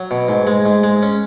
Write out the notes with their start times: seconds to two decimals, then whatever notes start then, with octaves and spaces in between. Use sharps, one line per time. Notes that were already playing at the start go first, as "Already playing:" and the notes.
Already playing: F#3
0.11 B2
0.28 G#2
0.47 G#3
0.66 G#2
0.83 G#3
1.03 C#4